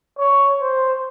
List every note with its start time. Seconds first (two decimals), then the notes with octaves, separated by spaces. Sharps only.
0.19 C#5
0.61 C5